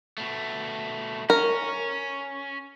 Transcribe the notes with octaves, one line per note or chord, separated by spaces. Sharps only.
B2 A3
C#4 A#4